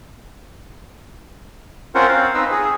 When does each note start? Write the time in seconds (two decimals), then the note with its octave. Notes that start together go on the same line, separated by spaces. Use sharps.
1.95 C4 C#4 F4 A#4 C5 F#5
2.08 C4 F5
2.34 C4 D#4 B4 D#5 E6
2.51 G#4